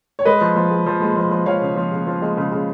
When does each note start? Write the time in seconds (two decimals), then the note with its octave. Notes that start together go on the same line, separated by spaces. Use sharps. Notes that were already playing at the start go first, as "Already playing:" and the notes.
0.19 C#5
0.25 G#3 B4 D#5
0.41 F3
0.56 F3
0.71 G#3
0.86 F3
1.02 G#3
1.16 F3
1.31 F3
1.46 F3 C#5 F5
1.61 C#3
1.76 F3
1.92 C#3
2.07 F3
2.22 G#3
2.37 C#3
2.52 C#3